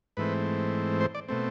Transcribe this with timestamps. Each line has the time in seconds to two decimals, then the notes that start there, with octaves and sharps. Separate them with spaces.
0.17 G#2 E3 A3 C4 B4
1.01 C5
1.15 D5
1.29 B2 A3 C4